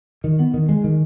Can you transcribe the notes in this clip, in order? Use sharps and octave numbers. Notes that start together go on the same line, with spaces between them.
D#3
B3
D#3
G#3
D#3